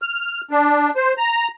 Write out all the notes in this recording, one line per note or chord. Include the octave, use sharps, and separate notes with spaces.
F6
D4
C5
A#5